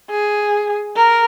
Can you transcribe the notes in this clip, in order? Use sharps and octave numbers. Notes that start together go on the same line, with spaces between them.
G#4
A#4